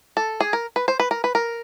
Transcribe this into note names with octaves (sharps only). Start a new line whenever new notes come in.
A4
G#4
A#4
B4
C5
B4
A#4
B4
A#4